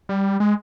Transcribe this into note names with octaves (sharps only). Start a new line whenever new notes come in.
G3
G#3